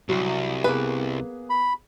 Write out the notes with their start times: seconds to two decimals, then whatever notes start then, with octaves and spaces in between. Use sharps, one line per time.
0.09 C2 F#3
0.64 A#3 B3 G#4 B4
1.50 B5